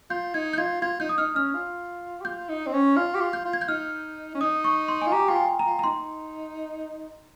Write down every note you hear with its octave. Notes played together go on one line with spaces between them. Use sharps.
F4 G6
D#4 G#6
G6
F4 G#6
F4 G#6
D#4 G6
D#6
D#4 F6
C#4 F6
F4
G4
F4 G6
D#4
C4
C#4
F4 F6
G4
F4
G6
F4
G#6
G6
D#4 F6
C#4
D#4 D#6
C#6
C6
G#5
F4
G4 A#5
F4 G5
G#5
A#5
F4
A#5
D#4 C6